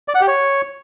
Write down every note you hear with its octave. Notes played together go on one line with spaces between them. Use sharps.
D5
F#5
G4
C#5